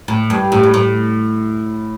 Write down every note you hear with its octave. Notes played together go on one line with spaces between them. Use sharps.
A2
G2
A2
G2
A2